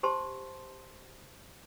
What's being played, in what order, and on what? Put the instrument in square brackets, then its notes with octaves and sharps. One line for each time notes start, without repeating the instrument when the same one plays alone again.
[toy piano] G4 C5 A5 C6